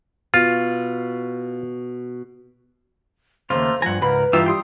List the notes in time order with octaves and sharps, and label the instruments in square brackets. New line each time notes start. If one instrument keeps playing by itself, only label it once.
[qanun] B2 [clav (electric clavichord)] F4
[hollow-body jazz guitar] D#2 C#3 [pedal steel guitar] A3 A#3 F4 [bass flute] C5
[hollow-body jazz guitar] G2 A#5 [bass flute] F3 [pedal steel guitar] F#5 G#5
[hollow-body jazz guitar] C#2 G#2 B5 [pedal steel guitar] A#4 [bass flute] B4
[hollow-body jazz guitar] G2 E3 F4 [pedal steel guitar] D#4 G4 E5
[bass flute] G3 [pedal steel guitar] G5 C6 D#6